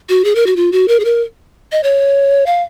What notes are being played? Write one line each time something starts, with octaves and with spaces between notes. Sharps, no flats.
F#4
G#4
A#4
F#4
F4
F#4
A#4
G#4
A#4
D#5
C#5
F5